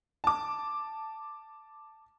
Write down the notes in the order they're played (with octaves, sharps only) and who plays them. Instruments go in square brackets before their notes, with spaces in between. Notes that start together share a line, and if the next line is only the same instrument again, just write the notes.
[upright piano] A5 D6